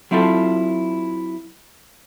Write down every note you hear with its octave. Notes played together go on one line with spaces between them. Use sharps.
F#3 C4 E4 F4 A4